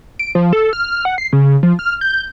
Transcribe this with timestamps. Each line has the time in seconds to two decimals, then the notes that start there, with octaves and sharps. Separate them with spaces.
0.19 D7
0.35 F3
0.53 A4
0.73 F6
1.05 F#5
1.18 C7
1.33 C#3
1.63 F3
1.79 F6
2.01 G6